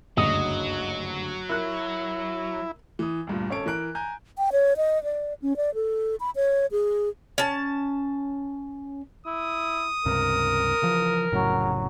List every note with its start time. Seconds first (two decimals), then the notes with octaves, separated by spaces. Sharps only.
0.17 F#1 D2 G2 F#3 D#5
1.49 E4 A#4 F#6
2.99 E3 D#6
3.27 D2 G2 A#2
3.50 G#1 C#4 A4 C#5 D7
3.66 E3 A#4 F#6 D7
3.95 G#5 A#5 G6
4.38 G5
4.52 C#5
4.77 D#5
5.04 D5
5.42 C#4
5.57 D5
5.75 A4
6.20 B5
6.36 C#5
6.72 G#4
7.38 C#4 A5
9.26 E4 D#6
10.05 C#2 G2 C3 A#4
10.82 C#3 E3 F3
11.32 F1 A2 C#3 F#3